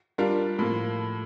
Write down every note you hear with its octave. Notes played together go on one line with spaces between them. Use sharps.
G3 D4 F4 A#4
A2 F3 A#3